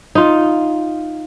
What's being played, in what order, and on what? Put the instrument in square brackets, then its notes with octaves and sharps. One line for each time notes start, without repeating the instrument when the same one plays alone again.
[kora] D#4 F4